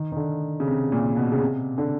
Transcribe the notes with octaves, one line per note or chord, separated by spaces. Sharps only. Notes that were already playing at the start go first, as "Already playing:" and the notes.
Already playing: D#3
D#3
D3
C#3
C3
A#2
B2
C#3
C3
D3